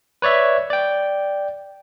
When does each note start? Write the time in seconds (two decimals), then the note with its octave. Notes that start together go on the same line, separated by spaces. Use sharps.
0.22 B4 C#5 D5 E5
0.70 D5 G5